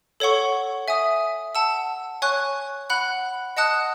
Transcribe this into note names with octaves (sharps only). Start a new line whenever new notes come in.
A4 C#5 F#5 C#6
E5 G#5 D#6
F#5 A5 E6
C#5 G#5 C#6 F#6
F#5 B5 F#6
D#5 F#5 A5 D#6 F#6